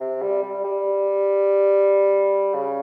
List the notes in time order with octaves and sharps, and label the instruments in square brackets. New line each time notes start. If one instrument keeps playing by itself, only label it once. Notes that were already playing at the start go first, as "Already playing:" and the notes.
[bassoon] C3
G3
G3
G3
C#3